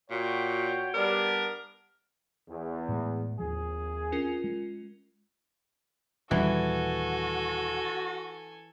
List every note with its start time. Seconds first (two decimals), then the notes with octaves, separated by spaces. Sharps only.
0.11 A#2 F#4 C#5 G5
0.94 G3 B3 D4 A#4
2.49 E2
2.88 A2 G#3
3.39 G#1 D#2 F3 G#4
4.12 C#4 F4 A#4
4.44 G#3
6.31 D#1 E3 G3 F#4 A4 G#5